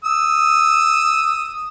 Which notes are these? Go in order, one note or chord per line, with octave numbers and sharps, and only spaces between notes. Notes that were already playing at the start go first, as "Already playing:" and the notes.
D#6 E6